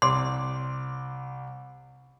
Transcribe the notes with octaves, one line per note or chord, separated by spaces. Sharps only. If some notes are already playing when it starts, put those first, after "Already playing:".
C2 C6 D6